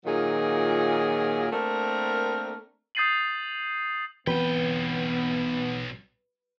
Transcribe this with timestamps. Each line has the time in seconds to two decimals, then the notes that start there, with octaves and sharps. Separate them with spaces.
0.05 A#2 D#3 F#3 F4 G#4
1.52 A3 A#3 C4 D4 A#4
2.95 D#6 G6 A6 C7 D#7 F#7
4.27 B1 E3 B3 C4 B4 G5